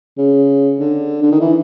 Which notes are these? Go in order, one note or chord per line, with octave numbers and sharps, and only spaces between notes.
C#3
D3
D3
D#3
E3